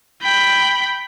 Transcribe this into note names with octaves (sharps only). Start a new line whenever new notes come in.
G5 B5